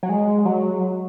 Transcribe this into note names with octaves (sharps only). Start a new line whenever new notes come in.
F#3
G#3
F#3